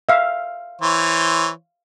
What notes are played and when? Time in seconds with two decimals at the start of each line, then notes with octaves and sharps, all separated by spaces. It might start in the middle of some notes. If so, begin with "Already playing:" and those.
0.09 E5 F5
0.82 E3 C5 C#5